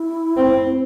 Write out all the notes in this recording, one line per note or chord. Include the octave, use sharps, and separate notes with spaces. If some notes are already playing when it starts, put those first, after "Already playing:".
Already playing: E4
C4